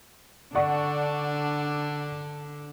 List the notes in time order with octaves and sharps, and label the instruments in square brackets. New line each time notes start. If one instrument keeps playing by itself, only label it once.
[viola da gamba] D3 D4 [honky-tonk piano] D5 F#5 C#6